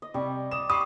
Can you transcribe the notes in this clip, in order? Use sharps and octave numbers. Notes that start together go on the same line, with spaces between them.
D#5
C3 G3 C#6
D5 D#6 E7
G4 B5 C#6 D#6 C7